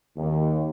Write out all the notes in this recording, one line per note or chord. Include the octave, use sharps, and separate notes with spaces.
D#2